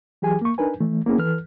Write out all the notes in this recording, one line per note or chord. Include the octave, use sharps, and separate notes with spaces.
E3 F#3 G4 G#4 G#5
A#3 C#6
D4 D#4 A#4 B4 G#5
E3 A3
A#3 B3 C#4 E4 G#4
E3 A4 B4 F6